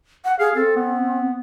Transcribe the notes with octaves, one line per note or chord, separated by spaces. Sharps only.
F#5
G#4 F5
C4 A4
B3